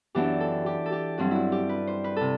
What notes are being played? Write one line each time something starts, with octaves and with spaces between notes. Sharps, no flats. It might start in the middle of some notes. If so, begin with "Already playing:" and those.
F#2 E3 B3 D4 G4
A4
G4
A4
G4
G2 F#3 C4 F#4
E4 F#4
G4
B4
C5
B4
C3 A4